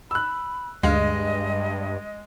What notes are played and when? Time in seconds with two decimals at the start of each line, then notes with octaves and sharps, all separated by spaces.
0.11 B5 E6 F#6
0.83 D2 G2 G#3 D#5 F5